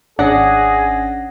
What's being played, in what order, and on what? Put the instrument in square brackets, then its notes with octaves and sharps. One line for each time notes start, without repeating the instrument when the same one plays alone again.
[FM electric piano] G#1 C#4 A#6 [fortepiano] D4 [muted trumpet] G#4 [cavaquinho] F#5